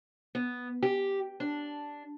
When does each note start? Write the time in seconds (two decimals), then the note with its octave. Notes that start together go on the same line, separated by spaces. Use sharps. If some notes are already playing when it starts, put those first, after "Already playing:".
0.35 B3
0.83 G4
1.40 D4